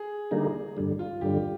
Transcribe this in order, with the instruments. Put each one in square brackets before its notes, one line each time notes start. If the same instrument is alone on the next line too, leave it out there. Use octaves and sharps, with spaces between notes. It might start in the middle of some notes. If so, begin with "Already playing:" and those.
Already playing: [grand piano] G#4
[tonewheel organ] D3 G3 A#3 D#4
G2 D3 G3
[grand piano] F4
[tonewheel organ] G2 D3 G3 [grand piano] G4